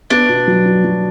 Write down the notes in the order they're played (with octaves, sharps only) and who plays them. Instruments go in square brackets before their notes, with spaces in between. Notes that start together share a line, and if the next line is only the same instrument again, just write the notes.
[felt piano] B3 [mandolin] D4
[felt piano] B2
F#3
F#3
F#3